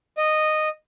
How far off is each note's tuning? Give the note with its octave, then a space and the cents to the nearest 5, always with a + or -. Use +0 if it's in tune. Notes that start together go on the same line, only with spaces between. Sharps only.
D#5 -10